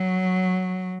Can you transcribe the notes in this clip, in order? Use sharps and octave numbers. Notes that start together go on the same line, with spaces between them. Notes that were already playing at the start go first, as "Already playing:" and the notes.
Already playing: F#3